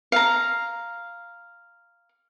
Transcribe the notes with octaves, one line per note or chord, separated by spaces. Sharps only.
F5 A#5